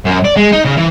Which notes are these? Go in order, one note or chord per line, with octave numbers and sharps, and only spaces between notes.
F#2
D5
G#3
D#4
C#3
E3